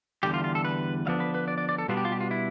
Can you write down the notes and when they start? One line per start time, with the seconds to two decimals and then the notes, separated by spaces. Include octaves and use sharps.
0.23 E2 D3 G3 G4
0.34 F4
0.44 F4
0.55 A4
0.65 B4
1.06 D3 F3 B3 D4 F5
1.20 B4
1.35 B4
1.48 D5
1.58 D5
1.69 D5
1.78 A4
1.88 B2 G3 B3 D4 F4
1.97 G4
2.05 F4
2.12 G4
2.20 F4
2.31 E4